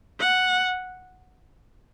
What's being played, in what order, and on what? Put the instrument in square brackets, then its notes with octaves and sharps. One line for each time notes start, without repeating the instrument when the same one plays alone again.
[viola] F#5